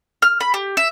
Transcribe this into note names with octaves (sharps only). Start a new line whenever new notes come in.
F6
B5
G4
E5